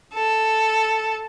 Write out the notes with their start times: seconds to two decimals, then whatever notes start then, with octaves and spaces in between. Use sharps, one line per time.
0.14 A4